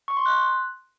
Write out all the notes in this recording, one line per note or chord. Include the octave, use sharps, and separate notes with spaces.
C#6
C6
F#6